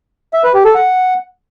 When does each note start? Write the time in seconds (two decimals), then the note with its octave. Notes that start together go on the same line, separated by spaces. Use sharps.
0.34 E5
0.44 B4
0.54 G4
0.65 A4
0.75 F#5